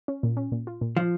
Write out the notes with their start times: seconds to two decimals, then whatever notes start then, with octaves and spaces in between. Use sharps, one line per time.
0.08 C#4
0.23 A#2
0.37 C#4
0.52 A#2
0.67 F4
0.81 A#2
0.96 F3 F4